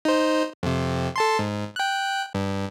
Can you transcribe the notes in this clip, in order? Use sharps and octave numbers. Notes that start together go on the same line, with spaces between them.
D#4 C5
F2 C3
A4 A5 C6
G#2
G5 F#6
G2